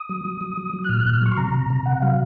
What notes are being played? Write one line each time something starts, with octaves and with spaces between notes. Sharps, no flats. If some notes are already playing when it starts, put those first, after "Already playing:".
Already playing: D#6
F#3
F#3
F#3
F#3
F#3
F#6
A#2 F6
A#2 F#6
F6
F#3 C#6
C6
C3 A#5
C3
C3
C3 F#5
F#3 F5